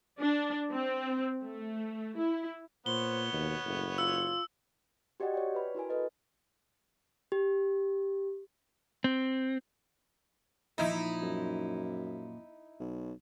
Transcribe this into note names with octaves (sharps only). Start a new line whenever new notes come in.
D4
C4
A3
E4
A#2 B3 C5 C#5 G7
D#2 B2
F#1 A2
F4 E6
F#4 G4 D5 D#5 F#5 G5
C#5 D5 G5
B4 B5
E4 F#4 A#4 G#5
A4 B4 D#5
G4
C4
A#2 F3 D#4 E4
F#2
B1